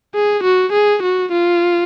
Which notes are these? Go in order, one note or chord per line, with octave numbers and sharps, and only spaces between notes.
G#4
F#4
G#4
F#4
F4